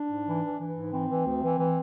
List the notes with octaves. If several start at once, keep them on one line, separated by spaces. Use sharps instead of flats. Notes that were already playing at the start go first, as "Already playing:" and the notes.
Already playing: D4
G#2
E3
E3
E3
G#2
E3 C4
E3
D2
E3
E3